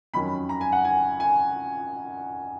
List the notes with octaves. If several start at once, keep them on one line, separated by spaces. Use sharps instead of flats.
F2 D#3 F#3 C#4 B5
A#5
G#5
F#5
G#5
G#5